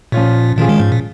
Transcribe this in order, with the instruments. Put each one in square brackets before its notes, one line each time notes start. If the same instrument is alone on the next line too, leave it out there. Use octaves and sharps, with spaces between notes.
[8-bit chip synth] A#2 [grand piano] F3 C#4 F4 C#5
[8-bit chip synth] A#2 D#3 [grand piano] F3 C#4 F4 G#4
[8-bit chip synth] D#3 G#3
G#2
A#2